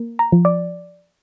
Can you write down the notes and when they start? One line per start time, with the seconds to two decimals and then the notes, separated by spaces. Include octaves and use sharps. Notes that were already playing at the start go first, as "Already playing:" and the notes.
Already playing: A#3
0.19 A#5
0.32 F3
0.45 D5